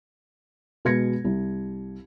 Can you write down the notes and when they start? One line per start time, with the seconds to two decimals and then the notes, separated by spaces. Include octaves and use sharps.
0.85 B2 G#3 B4 G#6 A#6 C#7
1.24 C2